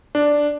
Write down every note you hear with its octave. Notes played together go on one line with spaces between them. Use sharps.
D4